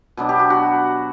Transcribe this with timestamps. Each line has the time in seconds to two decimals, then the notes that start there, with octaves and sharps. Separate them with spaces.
0.17 B2 F#3 B3 D4
0.29 G4
0.40 F#4
0.50 F#4